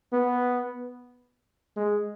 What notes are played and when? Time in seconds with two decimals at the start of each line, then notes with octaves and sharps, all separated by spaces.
0.13 B3
1.77 G#3